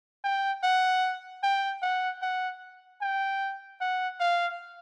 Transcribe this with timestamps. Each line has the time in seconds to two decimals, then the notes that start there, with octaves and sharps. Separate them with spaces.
0.24 G5
0.63 F#5
1.43 G5
1.82 F#5
2.22 F#5
3.01 G5
3.81 F#5
4.20 F5